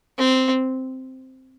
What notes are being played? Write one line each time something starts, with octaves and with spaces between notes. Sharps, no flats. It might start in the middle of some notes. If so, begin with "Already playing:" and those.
C4